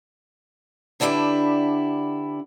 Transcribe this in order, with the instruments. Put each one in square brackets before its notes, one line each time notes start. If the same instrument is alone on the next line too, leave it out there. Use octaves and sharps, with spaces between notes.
[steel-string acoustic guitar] D3 D4 E4 F#4 G4 B4